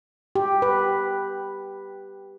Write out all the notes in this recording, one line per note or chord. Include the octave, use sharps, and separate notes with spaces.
G4
B4